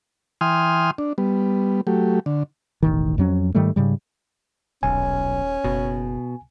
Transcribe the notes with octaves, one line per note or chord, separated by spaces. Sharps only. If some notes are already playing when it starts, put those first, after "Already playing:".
E3 G5 G#5 C6 D#6 F6
D4
G3 B3
F#3 A3 G4
D3
E1 A1 D#3
F2 F#3 C#4
G#2 D#3 G3 A3
G#2 C#3 G3
D#1 B1 C#4 G#5
F#1 B2